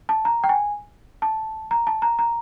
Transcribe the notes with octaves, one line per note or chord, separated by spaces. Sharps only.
A5
A#5
G5
G#5
A5
A#5
A5
A#5
A#5